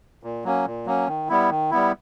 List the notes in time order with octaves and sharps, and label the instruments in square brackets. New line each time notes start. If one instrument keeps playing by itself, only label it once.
[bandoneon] A#2
F#3 A#3 C#4
A#2
F#3 A#3 C#4
D#3
G3 B3 E4
D#3
G3 B3 E4